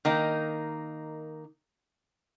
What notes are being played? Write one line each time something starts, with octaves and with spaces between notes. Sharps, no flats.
D#3 A#3 D#4